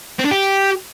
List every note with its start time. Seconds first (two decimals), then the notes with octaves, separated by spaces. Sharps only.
0.19 C4
0.25 D4
0.31 G4